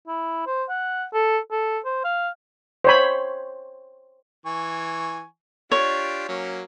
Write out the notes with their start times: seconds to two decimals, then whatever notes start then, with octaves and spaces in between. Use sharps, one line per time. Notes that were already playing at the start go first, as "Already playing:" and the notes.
0.08 E4
0.46 C5
0.69 F#5
1.14 A4
1.51 A4
1.85 C5
2.04 F5
2.84 C5 C#5 B5
4.46 E3 G#5 C#6
5.72 D4 F4 G4 C#5
6.28 F#3 A#3 C#4